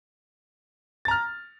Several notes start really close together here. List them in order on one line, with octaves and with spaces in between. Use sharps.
A6 A#5 F6